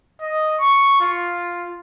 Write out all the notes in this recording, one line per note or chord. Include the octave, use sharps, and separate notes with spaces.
D#5
C#6
F4